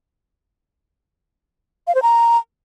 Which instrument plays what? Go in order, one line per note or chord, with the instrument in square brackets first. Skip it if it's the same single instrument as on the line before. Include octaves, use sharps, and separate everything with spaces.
[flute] F5
C5
A#5